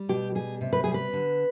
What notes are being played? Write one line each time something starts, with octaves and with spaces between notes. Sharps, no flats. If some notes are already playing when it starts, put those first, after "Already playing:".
Already playing: G3
B2 G4
G3 G#4
C3
B4
G3 G#4
B4
D3